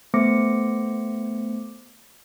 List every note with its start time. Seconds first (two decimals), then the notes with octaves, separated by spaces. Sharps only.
0.14 A3 B3 C5 D6 A#6 C#7